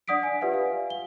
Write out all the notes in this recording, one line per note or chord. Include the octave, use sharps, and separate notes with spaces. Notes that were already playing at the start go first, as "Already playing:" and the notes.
D4 D5 F#5 D#6 B6 D7
G#5
F4 G4 B4 D5 E5 F#5
F5
G7